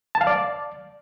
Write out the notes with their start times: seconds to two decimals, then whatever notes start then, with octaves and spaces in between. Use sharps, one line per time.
0.15 A5
0.21 F5
0.27 D5